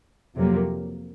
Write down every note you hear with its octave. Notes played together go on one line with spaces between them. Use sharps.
F2 C3 F#3 A#3